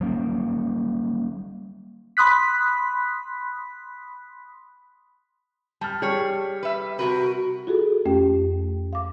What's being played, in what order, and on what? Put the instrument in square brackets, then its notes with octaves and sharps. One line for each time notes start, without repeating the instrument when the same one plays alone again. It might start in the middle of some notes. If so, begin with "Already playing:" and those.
[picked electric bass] F#3 G3 A#3 C#4
[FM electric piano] B5 C6 D#6 F#6 B6
[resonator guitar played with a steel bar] G3 [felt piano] A5 F6
[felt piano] G3 [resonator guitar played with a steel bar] G#4 C#5
[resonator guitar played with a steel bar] B4 E5
[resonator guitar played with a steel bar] C3 A#4 B4 [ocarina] F#4
[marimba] F4 F#4 G#4 A4
F2 A3 C#4 G4 G5
F5 D6